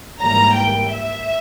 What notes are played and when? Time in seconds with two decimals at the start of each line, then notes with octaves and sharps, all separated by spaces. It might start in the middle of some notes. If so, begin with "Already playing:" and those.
0.21 G#2 E3 G3 A#3 A#5
0.57 G5
0.91 E5